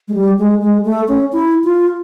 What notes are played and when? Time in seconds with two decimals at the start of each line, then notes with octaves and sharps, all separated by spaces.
0.08 G#3
0.14 G3
0.38 G#3
0.61 G#3
0.85 A3
1.08 C#4
1.32 E4
1.64 F4